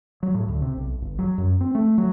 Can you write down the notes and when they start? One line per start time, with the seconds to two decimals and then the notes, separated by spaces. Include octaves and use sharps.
0.23 F#3
0.34 A2
0.49 D2
0.62 C3
0.77 B1
1.02 G1
1.19 F#3
1.38 F#2
1.61 C4
1.75 A3
1.98 F#3